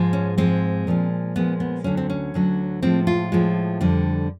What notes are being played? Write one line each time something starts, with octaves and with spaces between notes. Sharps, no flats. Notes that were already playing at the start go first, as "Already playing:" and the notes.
Already playing: G#2 F3 G#3
C#4
G#2 F3 G#3 C4
A#2 F3 G#3
A#2 F3 G#3 B3
B3
D2 D3 F#3 C#4
C4
C#4
D2 D3 F#3
A2 F3 G#3 C4
F4
A2 F3 G#3
F2 D3 G3